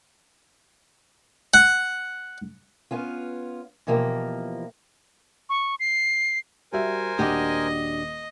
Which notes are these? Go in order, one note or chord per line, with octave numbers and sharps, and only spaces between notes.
F#5
B3 C#4 F4
B2 E3 F3 A#3 G4
C#6
C7
G3 F#4 A#4 C5 E5 G#5
D#1 D4 F#4 G4 D#5 D6 D#6